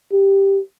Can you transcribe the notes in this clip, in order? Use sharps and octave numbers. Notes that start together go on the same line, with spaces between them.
G4